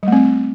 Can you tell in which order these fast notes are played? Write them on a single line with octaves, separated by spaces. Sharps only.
G3 A3 C4